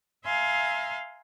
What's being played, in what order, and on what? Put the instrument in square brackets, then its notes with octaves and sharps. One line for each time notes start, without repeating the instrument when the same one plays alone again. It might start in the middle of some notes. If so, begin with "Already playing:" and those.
[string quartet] E5 F5 G#5 A#5 C6